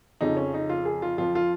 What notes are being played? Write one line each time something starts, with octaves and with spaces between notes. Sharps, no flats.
F2 C#3 F3 D#4
C#4
D#4
F4
G#4
F4
F2 F3 F4
F4